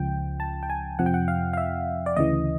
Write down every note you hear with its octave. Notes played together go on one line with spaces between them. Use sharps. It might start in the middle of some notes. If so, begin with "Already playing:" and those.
Already playing: C#2 C#3 F3 G5
A5
G5
G#5
F2 C3 F3 F#5
G5
F#5
F5
F5
E5
D5
D2 C#3 E3 D#5